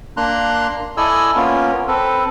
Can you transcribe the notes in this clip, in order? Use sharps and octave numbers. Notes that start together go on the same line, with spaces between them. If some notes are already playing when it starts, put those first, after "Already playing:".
A#3 D4 A#5 C6 F#6
E4 A4 D5 D#5 G#5 E6
A#3 B3 C#4 F4 A#4 C#5
C4 A4 B4